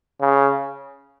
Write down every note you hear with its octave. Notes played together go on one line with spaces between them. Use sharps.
C#3